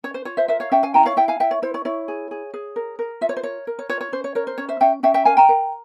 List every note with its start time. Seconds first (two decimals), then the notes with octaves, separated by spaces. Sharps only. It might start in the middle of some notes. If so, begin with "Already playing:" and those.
0.04 C#4 C#5
0.14 C5
0.25 F4 C#5
0.37 C5 E5
0.48 A#4 C5 E5
0.60 C#5 F5
0.71 C#4 E5 G5
0.83 F5 G#5
0.94 E4 G5 A#5
1.05 C#5 F5
1.16 E4 E5 G5
1.28 F5 G#5
1.40 E4 E5 G5
1.51 C#5
1.62 E4 C5
1.74 C#5
1.85 E4 C#5
2.08 G#4
2.31 G#4
2.54 G#4
2.76 A#4
2.99 A#4
3.21 F4 E5
3.29 C#5
3.37 C5
3.43 A#4 C#5
3.67 A#4
3.79 C#5
3.89 F4 C#5
4.01 C#5
4.12 C#4 C5
4.24 C#5
4.35 A#4 C#5
4.47 C5
4.58 C#4 C#5
4.69 C5 E5
4.80 C#4 E5 G5
5.03 C#4 E5 G5
5.14 E5 G5
5.25 A#4 F5 G#5
5.37 G5 A#5
5.49 A#4